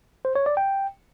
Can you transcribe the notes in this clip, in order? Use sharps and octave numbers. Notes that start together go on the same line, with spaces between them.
C5
C#5
D5
G5